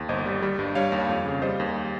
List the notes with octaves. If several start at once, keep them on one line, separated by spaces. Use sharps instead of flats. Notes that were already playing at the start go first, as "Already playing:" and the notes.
Already playing: D#2
G1 C5 D#5
G3
G3
G2
G3 C#5 F5
D#2
F2
C#3
G3 C5 D#5
D#2